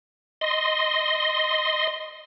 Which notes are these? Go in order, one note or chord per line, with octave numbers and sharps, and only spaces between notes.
D#5 C6